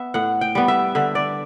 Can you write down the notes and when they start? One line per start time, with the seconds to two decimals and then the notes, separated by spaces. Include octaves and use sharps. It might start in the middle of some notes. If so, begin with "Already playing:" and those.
Already playing: B3 E5
0.14 A2 F#5
0.41 G5
0.55 G3 B3
0.68 E5
0.95 D3 E5
1.15 D5